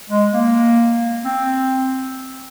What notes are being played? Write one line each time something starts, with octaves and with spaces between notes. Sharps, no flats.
G#3
A#3
C4